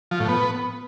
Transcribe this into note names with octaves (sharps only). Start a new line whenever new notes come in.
F3
A2
B3